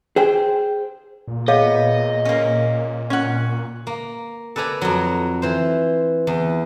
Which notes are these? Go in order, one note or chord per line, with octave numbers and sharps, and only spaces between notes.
G#4 C5 G5
A#2
B3 G#4 C#5 D#5 F5
A#3 C#4
C#4 F#5
A#3
A4 B4 D5 G#5 A#5
F2 F#3
E3 C5
E2